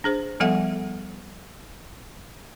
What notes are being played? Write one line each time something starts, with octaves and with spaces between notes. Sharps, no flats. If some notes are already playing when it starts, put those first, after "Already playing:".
D4 G#4 C5
F3 G3 B3 A4 E5 F#5